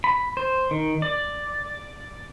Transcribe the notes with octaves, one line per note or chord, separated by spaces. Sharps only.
B5
C5
D#3
D5